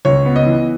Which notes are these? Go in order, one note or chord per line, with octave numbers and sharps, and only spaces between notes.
C#2 C#5
B3
D#5
E3